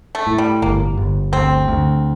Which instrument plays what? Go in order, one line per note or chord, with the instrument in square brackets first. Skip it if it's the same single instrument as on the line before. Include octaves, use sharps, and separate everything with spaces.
[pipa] A3
[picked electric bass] A2
[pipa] G3
[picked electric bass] G1 [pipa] A#3
[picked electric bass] G1
[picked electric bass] D2 [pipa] C4
[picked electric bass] D2